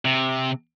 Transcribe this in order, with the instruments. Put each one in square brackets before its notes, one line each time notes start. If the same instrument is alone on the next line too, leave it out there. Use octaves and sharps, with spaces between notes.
[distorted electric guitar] C3